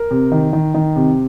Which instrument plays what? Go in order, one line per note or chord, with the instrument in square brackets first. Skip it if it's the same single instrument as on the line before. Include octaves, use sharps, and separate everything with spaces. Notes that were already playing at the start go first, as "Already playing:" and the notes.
Already playing: [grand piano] A#4
C3
D#3
D#3
D#3
C3